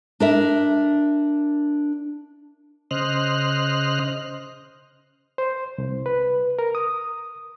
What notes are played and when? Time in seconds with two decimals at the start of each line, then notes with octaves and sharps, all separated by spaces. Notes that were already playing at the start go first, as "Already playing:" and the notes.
0.20 D4 A#4 E5
2.91 C#3 C5 D#5 F6 F#6
5.38 C5
5.78 C2
6.06 B4
6.59 A#4
6.75 D#6